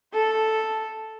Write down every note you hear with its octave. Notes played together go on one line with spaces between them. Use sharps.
A4